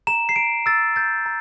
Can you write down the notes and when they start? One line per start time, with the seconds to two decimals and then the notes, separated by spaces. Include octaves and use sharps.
0.07 A#5 E7
0.29 C7
0.36 A#5 D7
0.66 E6 A6
0.96 G6 A6
1.26 A#5